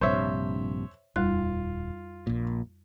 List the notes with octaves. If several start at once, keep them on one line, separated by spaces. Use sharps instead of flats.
A#1 G2 C3 C5 C#5 E5
D#1 F2 G3 F4 F#6
A#1 A#2